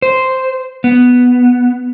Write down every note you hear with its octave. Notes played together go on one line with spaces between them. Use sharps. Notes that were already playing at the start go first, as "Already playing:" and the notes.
C5
B3